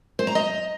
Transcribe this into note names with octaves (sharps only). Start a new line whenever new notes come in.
C5
A#5
D#5